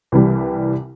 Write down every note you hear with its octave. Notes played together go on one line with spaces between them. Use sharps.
C2 E3 G3